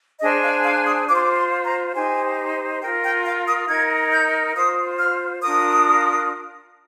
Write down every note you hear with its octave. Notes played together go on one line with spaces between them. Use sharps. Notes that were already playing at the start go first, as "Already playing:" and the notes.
D4 G#4 C5 D#5
F5
F5
D#6
F4 C5 D6
C6
D6
C6
A#5
D#4 G4 C5 G#5
F4 A#4 G5
G5
F5
D#6
D#4 A#4 G#6
G6
F4 C5 D#6
F6
D4 F4 A#4 D#6